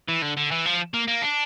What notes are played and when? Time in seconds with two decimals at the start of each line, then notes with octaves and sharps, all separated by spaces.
0.08 E3
0.22 D3
0.37 D3
0.51 E3
0.66 F3
0.94 A#3
1.08 A#3
1.22 D4